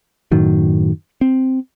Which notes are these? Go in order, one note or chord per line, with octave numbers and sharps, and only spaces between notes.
F#2 A2 D#3 F#3
C4